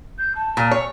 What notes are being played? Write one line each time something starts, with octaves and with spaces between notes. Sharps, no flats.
G6
A5
A#2
C#5